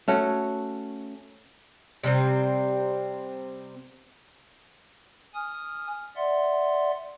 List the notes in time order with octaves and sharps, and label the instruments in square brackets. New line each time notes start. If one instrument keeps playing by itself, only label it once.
[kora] A3 C#4 F#4
[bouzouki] C3 G3 A#3 C4
[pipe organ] G#5 D#6 F6
D5 E5 F#5 C6